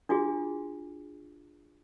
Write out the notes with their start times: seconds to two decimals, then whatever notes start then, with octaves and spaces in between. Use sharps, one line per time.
0.09 D4 F4 F#4 G#4